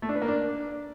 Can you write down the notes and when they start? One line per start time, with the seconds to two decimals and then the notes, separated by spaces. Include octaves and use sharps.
0.02 A3
0.09 D4
0.15 B4
0.22 A#3
0.28 D4